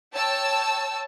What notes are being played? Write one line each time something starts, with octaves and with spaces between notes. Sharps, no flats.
C#5 G5 A5 E6